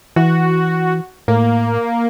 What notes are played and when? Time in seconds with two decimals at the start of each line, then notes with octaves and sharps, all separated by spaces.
0.16 E3 F#4
1.28 A2 A#3